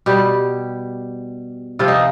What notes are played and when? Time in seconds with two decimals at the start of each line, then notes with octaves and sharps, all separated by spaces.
0.06 B2 G3 G4
1.79 C3 F3 F4
1.88 D#4